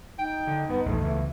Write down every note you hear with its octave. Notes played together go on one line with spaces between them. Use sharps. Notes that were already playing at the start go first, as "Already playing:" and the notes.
D#4 G5
D3
G2 B3
A#1 E2 G2 A3
C#2 B2 E3 E5